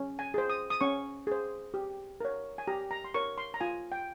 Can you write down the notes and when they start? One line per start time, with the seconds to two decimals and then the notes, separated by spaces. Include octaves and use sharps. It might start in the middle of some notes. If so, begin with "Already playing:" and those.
Already playing: C#4
0.19 G#5
0.34 G#4 C5
0.50 D#6
0.70 D#6
0.81 C#4 C#6
1.27 G#4 C5
1.74 G4
2.21 A#4 C#5
2.58 G#5
2.68 G4 A#5
2.91 A#5
3.05 C6
3.14 A#4 C#5 C#6
3.38 C6
3.54 A#5
3.61 F4 G#5
3.92 G5